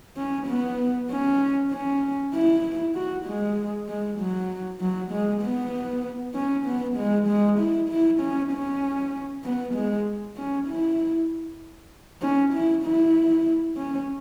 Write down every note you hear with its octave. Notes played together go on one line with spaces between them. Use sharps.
C#4
B3
C#4
C#4
E4
F#4
G#3
G#3
F#3
F#3
G#3
B3
C#4
B3
G#3
G#3
E4
E4
C#4
C#4
B3
G#3
C#4
E4
C#4
E4
E4
C#4